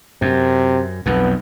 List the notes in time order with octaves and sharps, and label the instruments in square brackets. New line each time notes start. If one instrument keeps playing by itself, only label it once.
[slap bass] F#2 [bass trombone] C3
[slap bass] B1 F2 [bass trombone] B3